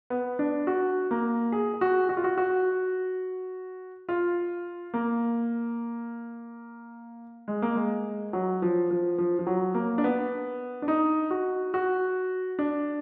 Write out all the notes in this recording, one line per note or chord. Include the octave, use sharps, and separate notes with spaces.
B3
D4
F#4
A#3
G#4
G#4
F#4
F#4
F4
F#4
F#4
F4
A#3
G#3
A#3
G#3
F#3
F3
F3
F3
F3
F#3
A#3
D4
B3
D4
D#4
F#4
F#4
D4